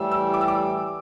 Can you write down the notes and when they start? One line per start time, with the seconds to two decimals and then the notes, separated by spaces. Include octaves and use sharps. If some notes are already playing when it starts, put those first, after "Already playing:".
Already playing: A2 E3 G3 E6
0.11 E6
0.34 D6
0.41 E6
0.48 D6